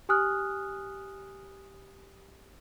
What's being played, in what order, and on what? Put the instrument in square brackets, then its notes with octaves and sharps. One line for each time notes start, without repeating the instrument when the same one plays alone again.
[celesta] G4 G#5 D#6 F6 F#6